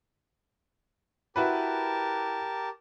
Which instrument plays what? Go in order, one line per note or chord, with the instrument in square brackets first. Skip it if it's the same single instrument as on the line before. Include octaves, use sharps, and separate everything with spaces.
[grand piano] E4 F#4 B4 [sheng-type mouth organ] G4 A#4 A5